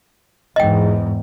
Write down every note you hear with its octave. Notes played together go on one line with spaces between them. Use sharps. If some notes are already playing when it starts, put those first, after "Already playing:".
E2 G#2 D#5 G5